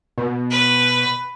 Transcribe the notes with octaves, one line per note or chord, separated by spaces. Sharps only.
B2
B4